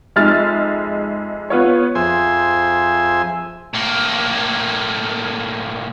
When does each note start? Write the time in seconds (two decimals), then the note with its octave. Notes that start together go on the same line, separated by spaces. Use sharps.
0.16 F2 G#3 D#4 E5 F6 A6
1.50 B3 F4 C#5
1.95 F2 G#4 C5 E5 G#5
3.74 A2 A#3